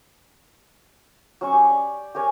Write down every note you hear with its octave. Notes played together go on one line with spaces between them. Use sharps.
F#3 C#4 C#6
G4 C#5
D5
G4 A#4 C#5 G#5